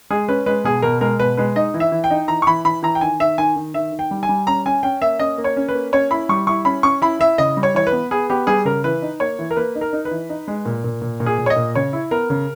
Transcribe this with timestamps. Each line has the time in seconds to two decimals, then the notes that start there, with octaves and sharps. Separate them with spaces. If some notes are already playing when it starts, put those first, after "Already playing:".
0.10 G#3 G#4
0.28 C#4 B4
0.46 G#3 B4
0.64 B2 G#4
0.82 B2 A#4
1.01 G#3 A#4
1.20 B2 B4
1.37 G#3 B4
1.56 D#4 D#5
1.74 E3
1.80 E5
1.92 E3
2.04 G5
2.11 D#4
2.28 E3 A#5
2.42 C#6
2.47 E3 B5
2.65 E3 B5
2.83 E3 A#5
2.95 G5
3.01 D#3 G#5
3.20 D#3 E5
3.38 D#3 G#5
3.56 D#3
3.74 D#3 E5
3.92 D#3
3.99 G5
4.11 G3
4.23 G#5
4.29 G3
4.47 C#4 A#5
4.66 C#4 G#5
4.83 C#4 G5
5.02 A#3 E5
5.19 C#4 D#5
5.38 A#3
5.44 C#5
5.57 C#4
5.69 B4
5.75 A#3
5.93 C#4 C#5
6.11 E4 B5
6.29 G3 C#6
6.47 E4 C#6
6.65 C#4 B5
6.83 C#4 C#6
7.02 E4 B5
7.19 E4 E5
7.38 C#3 D#5
7.57 G3
7.63 C#5
7.75 E3 C#5
7.87 B4
7.92 B3
8.11 B3 G#4
8.30 B3 G4
8.47 G3 G#4
8.65 C#3 A#4
8.84 E3 B4
9.02 D#4
9.20 A#3 C#5
9.39 E3
9.51 A#4
9.57 A#3 B4
9.75 D#4
9.81 A#4
9.93 D#4
10.05 B4
10.11 E3
10.29 D#4
10.48 G#3
10.65 A#2
10.84 A#2
11.02 A#2
11.20 A#2
11.26 G#4
11.39 A#2
11.46 C#5
11.50 D#5
11.56 A#2
11.75 C#3 C#5
11.93 E4
12.11 B3 A#4
12.30 C#3